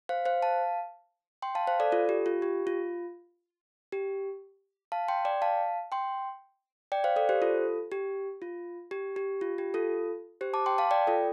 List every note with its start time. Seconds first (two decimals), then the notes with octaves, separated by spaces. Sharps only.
0.09 C5 F5
0.25 C5 F5
0.42 F5 A5
1.42 G5 C6
1.55 F5 A5
1.67 C5 F5
1.80 A4 D5
1.92 F4 A4
2.09 G4
2.26 F4
2.42 G4
2.67 F4
3.92 G4
4.92 F5 A5
5.08 G5 C6
5.25 D5 G5
5.42 F5 A5
5.92 G5 C6
6.92 D5 G5
7.04 C5 F5
7.16 A4 D5
7.29 G4 C5
7.42 F4 A4
7.92 G4
8.42 F4
8.91 G4
9.16 G4
9.41 F4
9.58 G4
9.74 F4 A4
10.41 G4 C5
10.54 A5 D6
10.66 G5 C6
10.78 F5 A5
10.91 D5 G5
11.07 F4 A4